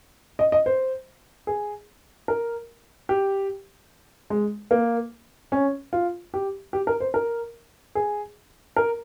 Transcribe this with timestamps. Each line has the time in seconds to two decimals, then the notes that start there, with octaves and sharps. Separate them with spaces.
0.39 D#5
0.52 D#5
0.66 C5
1.47 G#4
2.28 A#4
3.09 G4
4.30 G#3
4.71 A#3
5.52 C#4
5.93 F4
6.34 G4
6.73 G4
6.87 A#4
7.00 C5
7.14 A#4
7.95 G#4
8.76 A#4